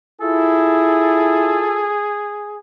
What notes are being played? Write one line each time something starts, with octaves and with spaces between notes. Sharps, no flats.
E4 F4 G#4 A4